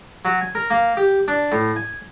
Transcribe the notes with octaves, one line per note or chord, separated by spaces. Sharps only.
F#3
G#5
A#4
A#3
G4
D4
A2
G#5